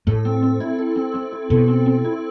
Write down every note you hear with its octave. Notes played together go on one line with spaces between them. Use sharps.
A2 A4
C4
C4
E4
A4
C4
C4
E4
B2 A4
C4
C4
E4